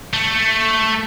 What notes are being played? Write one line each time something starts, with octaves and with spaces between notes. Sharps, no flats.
A3